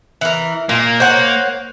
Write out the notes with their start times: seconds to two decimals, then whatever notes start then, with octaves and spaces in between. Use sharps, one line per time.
0.21 E3 A#4
0.69 A#2 A#3
1.00 C5 C#5 F#5